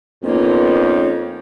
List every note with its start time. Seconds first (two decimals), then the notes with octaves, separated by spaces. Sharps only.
0.24 F2 A#3 B3 C#4 D#4 F4 C#5